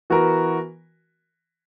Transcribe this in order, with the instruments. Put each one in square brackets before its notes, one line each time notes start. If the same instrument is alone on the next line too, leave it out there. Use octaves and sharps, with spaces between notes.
[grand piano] E3 B3 F#4 A#4